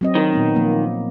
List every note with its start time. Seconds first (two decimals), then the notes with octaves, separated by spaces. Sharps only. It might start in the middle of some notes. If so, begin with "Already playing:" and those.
0.01 F#3 C4 D#5
0.15 D#3
0.33 A#2 B3 C4
0.55 F3 A#3